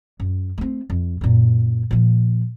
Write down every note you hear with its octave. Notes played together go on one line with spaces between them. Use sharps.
F#2
A3 C4
F2
F#2 A#2
A#2 F3